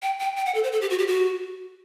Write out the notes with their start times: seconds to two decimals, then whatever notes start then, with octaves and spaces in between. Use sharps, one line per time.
0.02 G5
0.20 G5
0.37 G5
0.46 F#5
0.55 A4
0.64 C5
0.72 A4
0.81 G4
0.90 F#4
0.99 G4
1.08 F#4